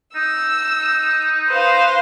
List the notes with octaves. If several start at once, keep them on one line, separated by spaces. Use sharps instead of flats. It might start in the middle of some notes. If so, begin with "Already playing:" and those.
D#4 E6
B4 C5 F5